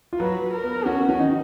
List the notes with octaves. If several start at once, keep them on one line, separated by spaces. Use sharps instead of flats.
F4
F#3 F#4 B4
A#4
B3
B3
C#4 F#4
B3
C#4
D#3 D#4